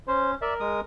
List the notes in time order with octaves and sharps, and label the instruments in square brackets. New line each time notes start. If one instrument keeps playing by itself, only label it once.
[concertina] C#4 [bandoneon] C5
[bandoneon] A#4 [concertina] D5 E5
[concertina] G#3 D#6